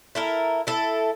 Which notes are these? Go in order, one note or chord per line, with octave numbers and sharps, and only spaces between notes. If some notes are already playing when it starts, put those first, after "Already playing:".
E4 A4 A#4
E4 A4